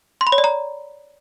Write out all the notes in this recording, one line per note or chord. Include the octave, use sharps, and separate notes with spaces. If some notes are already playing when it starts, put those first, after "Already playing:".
C6
B5
C#5
D5
A#5